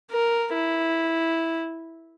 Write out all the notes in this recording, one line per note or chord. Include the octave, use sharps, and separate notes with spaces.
A#4
E4